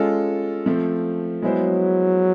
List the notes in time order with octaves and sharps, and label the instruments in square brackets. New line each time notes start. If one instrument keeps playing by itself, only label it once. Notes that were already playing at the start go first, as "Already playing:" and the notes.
Already playing: [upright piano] G#3 C#4 F4 A4
F3 A3 C4
[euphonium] F#3 [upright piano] G#3 B3 E4 G#4 C5